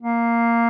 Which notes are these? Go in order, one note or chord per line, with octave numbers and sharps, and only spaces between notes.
A#3